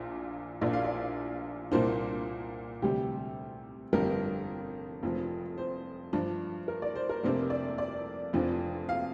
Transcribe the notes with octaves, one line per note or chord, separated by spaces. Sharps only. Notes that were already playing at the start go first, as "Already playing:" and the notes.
Already playing: A#1 A#2 D4
A#1 A#2 A#3 D4 D5
F5
D5
C2 A#2 A#3 D4 C5
D2 C3 G3 G4
G1 F2 D3 G3 A#4
F1 F2 F3
C5
G2 F3 D4
A#4
D5
C5
A#4
F1 F2 C3 A#3 D4 C5
D5
D5
F1 F2 F3 D4
F5